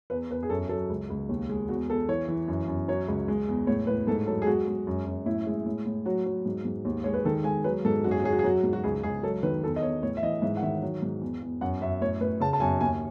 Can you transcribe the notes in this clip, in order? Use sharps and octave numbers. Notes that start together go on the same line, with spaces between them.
E2 B4
E2 B4
G#4
F#2 A4
F#3 A4
C#2
C#2
D#2
G#3
E2 F#4
E2 A4
E3 C#5
E3
F#2
F#2
F#3 C#5
C#2
G#3
E2
A2 C#5
A2 B4
G#2 A4
F#3 A4
G#4
G#3 F#4
G#3
F#2
F#2
A2 E4
G#3
A2
A2
F#3 F#4
F#3
G#2
G#2
D#2
G#3 C#5
B4
D#3 A4
G#3 G#5
F#3 B4
G#2 A4
F#2 F#4
G#4
F#4
F#3 G#4
F#4
G#4
F#3 F#4
G#2
F#4
C#2 G#4
C#2 G#4
F#3 A4
D#3 B4
E2 A4
D#5
E2 C#5
A2 C#5
E5
E3 D#5
G#2 E5
F#5
D#3 E5
F#3
G#2
E2
E2
F#2 F#5
F#2 E5
A2 C#5
A2 B4
C#3 A5
A5
F#2 G#5
D#2 G#5